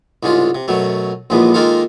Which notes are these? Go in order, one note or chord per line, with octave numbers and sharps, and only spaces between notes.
C2 G#2 C#3 G#3 F4
C3
F#2 B2 F#3 A3
A#1 D#2 A#2 E3 G#3 B3
D#3 G#3 A#3 D#4 F4 A4